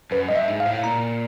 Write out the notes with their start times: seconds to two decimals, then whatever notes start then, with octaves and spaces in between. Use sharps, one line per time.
0.11 F#2 B4
0.29 G2 D#5
0.36 E5
0.48 G#2
0.60 F5
0.65 A2
0.84 A#2 A#5